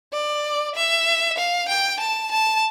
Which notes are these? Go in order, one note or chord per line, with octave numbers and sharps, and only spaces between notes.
D5
E5
F5
G5
A5
A5